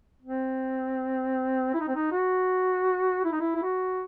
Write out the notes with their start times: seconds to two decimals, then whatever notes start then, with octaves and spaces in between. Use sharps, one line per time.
0.22 C4
1.74 E4
1.80 D#4
1.88 C4
1.96 D#4
2.12 F#4
3.25 E4
3.32 D#4
3.41 E4
3.56 E4
3.63 F#4